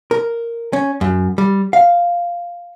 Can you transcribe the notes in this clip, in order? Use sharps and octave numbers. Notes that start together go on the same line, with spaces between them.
A#4
C#4
F#2
G3
F5